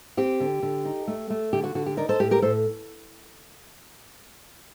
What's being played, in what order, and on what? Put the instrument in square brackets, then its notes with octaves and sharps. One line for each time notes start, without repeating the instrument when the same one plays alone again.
[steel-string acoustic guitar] C4 G4
D3
D3
D#4
A3
A3
D3 G4
F#4
D3 F#4
G4
D#4 A#4 D5
A4 C5
A2 G4
G4 A#4
A2 A4 C5